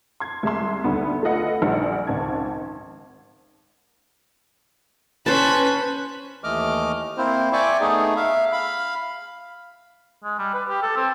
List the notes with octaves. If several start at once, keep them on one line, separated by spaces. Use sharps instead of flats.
C6 G#6
C2 G#3 E5 C6
D2 D3 D#3 G3 B3
A3 F4 B4 D#5 F#5
A#1 G3 C5 F#5
G#1 C#2 A5 G#6
C#4 B4 C5 A5 B5
D#2 E3 A3 D#5 D6 F6
A#3 C4 E4 C5
D5 E5 G5 G#5 C#6 D6
A3 B3 D#4 G#4
E5 F5
F5 B5
G#3
G3
B4
G4
A4
C4